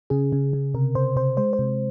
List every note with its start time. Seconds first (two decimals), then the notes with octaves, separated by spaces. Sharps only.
0.10 C#3 G#4
0.32 C#3
0.53 C#3
0.74 C3 A#4
0.95 C3 C5
1.16 C3 C5
1.37 G#3 C5
1.53 C5
1.59 C3